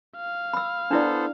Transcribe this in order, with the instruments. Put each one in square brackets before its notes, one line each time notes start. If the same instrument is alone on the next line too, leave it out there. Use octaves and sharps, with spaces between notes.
[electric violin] F5
[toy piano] B5 E6
[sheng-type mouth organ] B3 A4 C5 [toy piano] D4 E4 D5